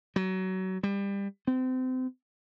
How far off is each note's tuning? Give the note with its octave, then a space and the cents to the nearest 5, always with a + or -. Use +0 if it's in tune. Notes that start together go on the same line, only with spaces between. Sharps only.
F#3 +25
G3 +25
C4 -30